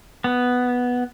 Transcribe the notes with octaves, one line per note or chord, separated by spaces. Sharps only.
B3